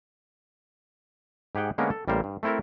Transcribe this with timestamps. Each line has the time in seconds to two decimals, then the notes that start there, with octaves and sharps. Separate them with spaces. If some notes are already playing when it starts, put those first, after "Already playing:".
1.55 G#2 G4 G#4 F#5 G5
1.78 D3 G#3 A#3 B3 C#4 A#4
1.91 A4
2.08 A1 G3 A#3 A#4 C5
2.24 G2
2.43 A3 C4 E4 A4 A#4